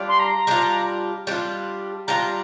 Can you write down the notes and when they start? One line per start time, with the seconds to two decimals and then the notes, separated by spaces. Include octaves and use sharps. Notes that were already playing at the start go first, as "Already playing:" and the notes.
Already playing: G3 D4 F4
0.08 C6
0.19 A#5
0.47 G3 D4 F4
1.27 G3 D4 F4
2.07 G3 D4 F4 A#5